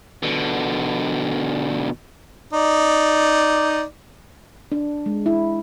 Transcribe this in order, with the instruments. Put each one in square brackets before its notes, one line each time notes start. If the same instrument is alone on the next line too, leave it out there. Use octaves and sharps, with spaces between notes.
[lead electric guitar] B2 D3
[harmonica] D#4 D5
[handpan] D4
G#3
E4